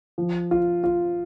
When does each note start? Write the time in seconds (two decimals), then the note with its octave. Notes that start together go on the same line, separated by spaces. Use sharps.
0.18 F3
0.51 F4
0.84 F4